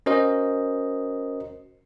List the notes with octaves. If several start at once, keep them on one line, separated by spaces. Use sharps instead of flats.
C#4 F#4 A#4 C5 D#5